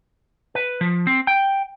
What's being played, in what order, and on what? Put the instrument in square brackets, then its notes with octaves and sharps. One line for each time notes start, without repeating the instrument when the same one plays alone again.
[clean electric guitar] B4
F3
C4
G5